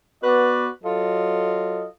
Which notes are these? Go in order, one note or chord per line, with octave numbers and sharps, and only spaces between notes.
B3 F#4 B4 D5
F#3 F4 A4 D#5